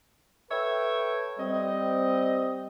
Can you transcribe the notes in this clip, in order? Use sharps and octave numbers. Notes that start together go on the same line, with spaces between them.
A4 B4 C#5 E5 G5
G3 C4 D#5